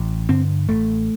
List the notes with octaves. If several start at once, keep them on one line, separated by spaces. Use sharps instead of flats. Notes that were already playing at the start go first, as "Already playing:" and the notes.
Already playing: A1
G2 D3 C4
A1 A3